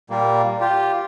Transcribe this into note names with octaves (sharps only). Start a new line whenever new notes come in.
A#2 G3 A#3
F4 G4